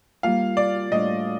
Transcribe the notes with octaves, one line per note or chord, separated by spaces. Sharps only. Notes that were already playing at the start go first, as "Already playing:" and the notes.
G3 A#3 F4 F5
D5
A2 G3 D4 D#5